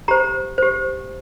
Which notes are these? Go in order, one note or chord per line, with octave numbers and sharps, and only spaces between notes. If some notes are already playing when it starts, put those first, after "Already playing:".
G4 C5 A#5
G4 C5